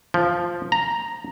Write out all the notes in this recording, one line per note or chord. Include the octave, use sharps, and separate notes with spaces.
F3
A#5